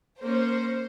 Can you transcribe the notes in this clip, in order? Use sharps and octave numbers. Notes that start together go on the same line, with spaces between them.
A#3 C#4 C5